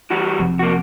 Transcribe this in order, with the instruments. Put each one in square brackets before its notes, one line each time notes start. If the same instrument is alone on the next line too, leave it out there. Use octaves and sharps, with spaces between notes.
[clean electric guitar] E3 G3 F#4
[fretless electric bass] F1 F2
[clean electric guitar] A#3 F#4